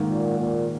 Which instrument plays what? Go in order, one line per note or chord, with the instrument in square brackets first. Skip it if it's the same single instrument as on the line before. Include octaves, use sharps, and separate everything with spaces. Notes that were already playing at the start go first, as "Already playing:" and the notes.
Already playing: [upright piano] G#2 D#3 A#3
[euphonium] A#2
A#2